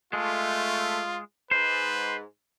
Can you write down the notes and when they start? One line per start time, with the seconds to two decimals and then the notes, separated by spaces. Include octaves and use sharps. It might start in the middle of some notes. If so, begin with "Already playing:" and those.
0.13 G#3 A3 F4
1.51 G#2 B4 C5